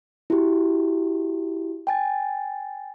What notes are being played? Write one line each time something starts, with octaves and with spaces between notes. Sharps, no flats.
E4 F#4 G4
G5 G#5 A6